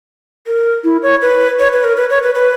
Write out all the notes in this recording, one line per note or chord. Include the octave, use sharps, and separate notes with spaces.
A#4
E4
C#5
B4
C#5
B4
A#4
B4
C#5
B4
B4